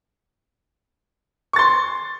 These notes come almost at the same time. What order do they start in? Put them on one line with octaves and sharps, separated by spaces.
C#6 A6 C6